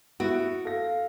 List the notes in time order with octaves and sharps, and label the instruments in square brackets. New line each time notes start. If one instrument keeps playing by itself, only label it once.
[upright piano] B3 E4 D7 [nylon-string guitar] F#4
[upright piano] A4 A#6 [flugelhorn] F5